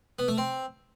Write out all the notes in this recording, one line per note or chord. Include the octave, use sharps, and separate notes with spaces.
B3
A3
C4